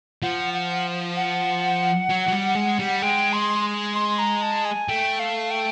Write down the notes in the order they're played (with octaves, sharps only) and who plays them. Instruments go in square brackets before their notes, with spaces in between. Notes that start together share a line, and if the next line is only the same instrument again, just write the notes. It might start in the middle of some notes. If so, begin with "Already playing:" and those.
[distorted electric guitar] F3 [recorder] F#5
[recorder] F#5
F#5
[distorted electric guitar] F#3
F#3
G3
G#3
G3
[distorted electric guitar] G#3 [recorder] G5
[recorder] C6
C6
A#5
A5
G#5
[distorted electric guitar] A3 [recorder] G5
[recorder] F5
G5